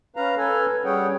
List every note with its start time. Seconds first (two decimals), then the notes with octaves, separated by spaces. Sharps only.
0.16 C#4 B4 F5 A#5
0.37 A4 B4 G#5
0.85 G3 C#4 G#4 C#5 F#5 G5